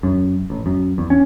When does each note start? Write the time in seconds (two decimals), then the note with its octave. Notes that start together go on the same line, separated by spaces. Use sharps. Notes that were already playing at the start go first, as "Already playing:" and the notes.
0.03 F#2
0.50 A1
0.66 F#2
0.98 E2
1.10 C#4